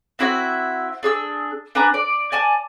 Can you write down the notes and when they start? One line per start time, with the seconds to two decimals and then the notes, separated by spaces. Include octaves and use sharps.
0.19 C4 E4 F#4 E5
1.03 D4 G#4 E6
1.75 D4 B4 G#5 A#5
1.94 D5
2.32 D5 G#5 A5